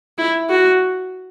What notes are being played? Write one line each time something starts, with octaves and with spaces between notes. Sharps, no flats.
E4
F#4